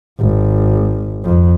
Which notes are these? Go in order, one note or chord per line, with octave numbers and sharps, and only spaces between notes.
G#1
F2